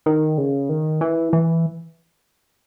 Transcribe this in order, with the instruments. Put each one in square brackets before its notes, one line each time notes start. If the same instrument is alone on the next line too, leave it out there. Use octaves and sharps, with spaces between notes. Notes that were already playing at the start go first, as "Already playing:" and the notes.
[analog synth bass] D#3
C#3
D#3
E3
E3